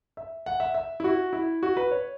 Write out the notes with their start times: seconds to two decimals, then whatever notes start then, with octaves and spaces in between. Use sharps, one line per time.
0.17 E5
0.46 F#5
0.60 E5
0.74 E5
1.00 E4
1.04 F#4
1.33 E4
1.63 F#4
1.77 B4
1.91 C#5